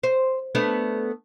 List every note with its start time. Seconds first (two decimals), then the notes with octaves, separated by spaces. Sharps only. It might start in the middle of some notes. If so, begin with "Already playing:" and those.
0.03 C5
0.55 A3 B3 D4